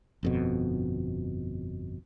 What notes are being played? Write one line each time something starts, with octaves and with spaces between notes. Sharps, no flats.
G1 F2 B2